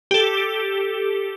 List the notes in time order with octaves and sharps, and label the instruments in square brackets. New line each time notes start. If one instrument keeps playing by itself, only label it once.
[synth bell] G4 A4